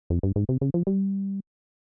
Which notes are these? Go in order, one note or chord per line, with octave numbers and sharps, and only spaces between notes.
F2
G2
G#2
C3
C#3
F3
G3